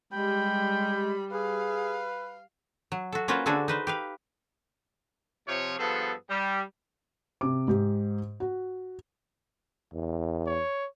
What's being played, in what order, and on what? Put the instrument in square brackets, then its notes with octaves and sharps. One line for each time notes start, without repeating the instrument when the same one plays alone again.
[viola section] G3 [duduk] G#3 [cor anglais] G5 [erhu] B5
[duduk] G#4 [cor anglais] B4 [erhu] F5
[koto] F#3
F#4 A4
A#3 C#4 F4 F#4 B4 C5
D3 D4 F#4 G#4 A4
D#4 B4 C5
G4 B4 F5
[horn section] C3 F3 C#5
G2 F3 B3 G#4 A4
G3
[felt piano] C3 D6
G#2 G4
F#4
[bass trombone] E2
[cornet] C#5